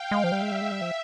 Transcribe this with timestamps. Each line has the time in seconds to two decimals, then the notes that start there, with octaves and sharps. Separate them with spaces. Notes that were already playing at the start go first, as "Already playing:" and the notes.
Already playing: F5 G5
0.11 G#3
0.24 F3
0.31 G3 E5
0.42 G#3
0.51 G3
0.61 G#3
0.71 G3
0.81 F3